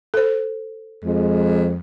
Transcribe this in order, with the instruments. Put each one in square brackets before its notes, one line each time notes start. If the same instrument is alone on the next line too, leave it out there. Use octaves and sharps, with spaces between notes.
[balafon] A4 C5
[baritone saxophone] F2 [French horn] G#3